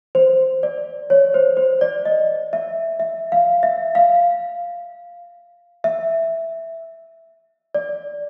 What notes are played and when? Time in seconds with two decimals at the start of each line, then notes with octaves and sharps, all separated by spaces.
0.15 C5
0.63 D5
1.10 C#5
1.34 C5
1.57 C5
1.81 D5
2.05 D#5
2.53 E5
3.00 E5
3.32 F5
3.63 E5
3.95 F5
5.84 E5
7.75 D5